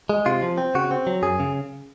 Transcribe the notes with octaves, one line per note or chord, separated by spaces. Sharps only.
G#3
C3 F4
F3
C4
C#3 F#4
C4
F#3
F#2 G#4
C#3